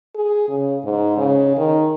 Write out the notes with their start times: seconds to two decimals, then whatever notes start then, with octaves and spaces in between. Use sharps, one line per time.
0.16 G#4
0.49 C#3
0.85 G#2
1.18 C#3
1.57 D#3